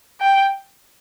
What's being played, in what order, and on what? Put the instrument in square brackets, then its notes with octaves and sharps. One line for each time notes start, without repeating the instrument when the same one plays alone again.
[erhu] G5